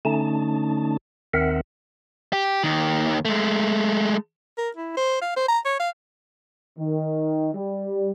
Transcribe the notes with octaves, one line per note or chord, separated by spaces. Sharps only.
D3 A3 C#4 D#4 A5
D#2 D#3 C4 A#4 E5 F#5
G4
D#2 D#3
G#3 A3
A#4
E4
C5
F5
C5
A#5
C#5
F5
D#3
G3